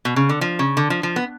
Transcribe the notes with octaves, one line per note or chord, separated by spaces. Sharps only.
B2
C#3
D3
F3
C#3
D3
F3
F3
B3